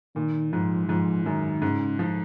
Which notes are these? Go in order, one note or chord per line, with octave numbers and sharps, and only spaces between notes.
A#2 D#3
G#2 F3
G#2 F3
F#2 D#3
G#2 C#3
F3